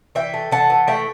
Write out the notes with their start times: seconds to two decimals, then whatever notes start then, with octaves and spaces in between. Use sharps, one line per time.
0.15 E3 E5 G5
0.34 A3
0.52 E3 F#5 A5
0.70 E3
0.88 A3 E5 G5